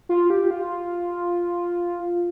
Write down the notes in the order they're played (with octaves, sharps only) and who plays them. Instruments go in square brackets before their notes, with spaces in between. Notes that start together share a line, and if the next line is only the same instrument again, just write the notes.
[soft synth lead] F4
G4
F4